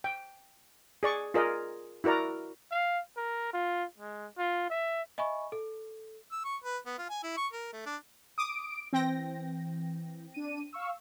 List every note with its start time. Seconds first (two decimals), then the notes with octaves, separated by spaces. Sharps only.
0.04 G5
1.03 G#4 D5 C#6
1.34 F4 G#4 A#4 D5 D#5
2.04 E4 F#4 A#4 D5 A#5
2.72 F5
3.17 A#4
3.53 F4
3.98 G#3
4.38 F4
4.70 E5
5.18 D#5 E5 G#5 B5 C#6
5.52 A4
6.32 E6
6.45 C#6
6.64 B4
6.86 B3
6.98 F4
7.10 G#5
7.24 E4
7.37 C#6
7.53 A#4
7.73 A3
7.86 D4
8.38 D6 D#6 D7
8.93 E3 C4 G5 A#6
10.34 D4 D#7
10.73 F5 C#6 E6